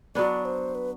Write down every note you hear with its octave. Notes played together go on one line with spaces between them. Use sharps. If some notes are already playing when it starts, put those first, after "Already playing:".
F#3 B3 D4 D5
C5
B4